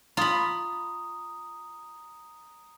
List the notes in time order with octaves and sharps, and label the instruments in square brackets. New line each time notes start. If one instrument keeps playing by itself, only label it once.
[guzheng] F4 B5 [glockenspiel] A#5 D#6